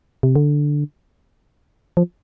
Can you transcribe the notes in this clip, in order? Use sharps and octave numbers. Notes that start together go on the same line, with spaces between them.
C3
D3
F3